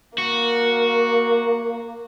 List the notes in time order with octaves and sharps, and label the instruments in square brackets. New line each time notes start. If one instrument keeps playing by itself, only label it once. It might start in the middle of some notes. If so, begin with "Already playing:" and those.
[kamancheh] A#3 [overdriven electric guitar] F#4